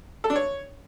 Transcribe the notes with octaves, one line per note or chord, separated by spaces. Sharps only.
A4
D4
C#5